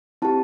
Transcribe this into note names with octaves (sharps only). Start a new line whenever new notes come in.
C4 E4 G4 A5